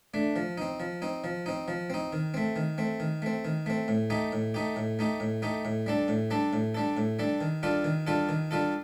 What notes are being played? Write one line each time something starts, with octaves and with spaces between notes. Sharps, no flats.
A3 D4
F3
C4 D#4
F3
C4 D#4
F3
C4 D#4
F3
C4 D#4
D#3
A3 C4
D#3
A3 C4
D#3
A3 C4
D#3
A3 C4
A2
A3 D#4 G4
A2
A3 D#4 G4
A2
A3 D#4 G4
A2
A3 D#4 G4
A2
G3 D4 A4
A2
G3 D4 A4
A2
G3 D4 A4
A2
G3 D4 A4
D#3
G3 D4 F4 A4
D#3
G3 D4 F4 A4
D#3
G3 D4 F4 A4